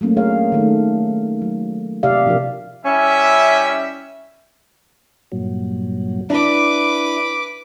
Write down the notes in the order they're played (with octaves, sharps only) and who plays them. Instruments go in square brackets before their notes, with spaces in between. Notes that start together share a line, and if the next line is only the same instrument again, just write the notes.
[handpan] F#3 A3 A#3 C#4
A3 D4 G#4 A#4 C#5 F5
D#3 A3
F#3
C3 G4 D5 E5 F5
B2 F3 D4 F4 A#4
[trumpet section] G3 E4 E5 [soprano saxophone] C#4
[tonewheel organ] G2 A#2 F#3
[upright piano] D4 [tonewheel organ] E4 [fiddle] B4 D6